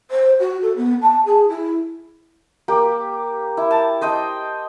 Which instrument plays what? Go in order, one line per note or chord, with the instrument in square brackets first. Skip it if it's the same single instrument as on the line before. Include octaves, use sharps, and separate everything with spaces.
[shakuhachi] C5
F#4
A4
B3
A5
G#4
E4
[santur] A#3 G4
E4
A5
C5 D#5 G5